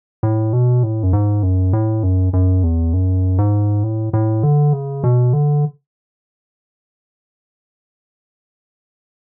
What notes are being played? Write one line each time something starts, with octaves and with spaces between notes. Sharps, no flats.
A2
B2
A2
F#2
G#2
F#2
A2
F#2
F#2
E2
F#2
G#2
A2
A2
D3
C#3
B2
D3